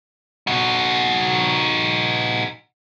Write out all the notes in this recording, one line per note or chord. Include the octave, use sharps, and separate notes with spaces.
D#4 F#4